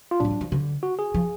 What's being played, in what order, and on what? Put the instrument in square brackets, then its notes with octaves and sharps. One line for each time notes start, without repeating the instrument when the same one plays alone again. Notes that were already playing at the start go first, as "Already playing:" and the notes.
[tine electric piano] F4
[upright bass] A2 [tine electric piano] D4
[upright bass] F3
F#3
F3
D3
[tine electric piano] F#4
G#4
[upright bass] F3